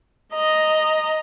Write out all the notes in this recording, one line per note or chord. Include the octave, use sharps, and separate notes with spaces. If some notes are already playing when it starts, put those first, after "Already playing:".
D#5 A#5